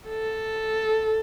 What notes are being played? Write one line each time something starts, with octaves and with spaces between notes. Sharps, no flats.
A4